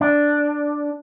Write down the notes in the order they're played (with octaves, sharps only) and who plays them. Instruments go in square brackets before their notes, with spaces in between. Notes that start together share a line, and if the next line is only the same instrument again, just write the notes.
[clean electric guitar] D4